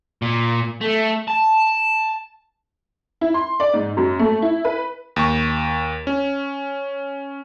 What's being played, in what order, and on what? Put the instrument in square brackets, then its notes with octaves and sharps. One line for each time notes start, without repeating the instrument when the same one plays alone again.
[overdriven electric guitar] A#2
A3
A5
[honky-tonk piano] E4
C6
D5
G#2
F#2
A3
E4
B4
[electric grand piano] D#2 C#6
C#4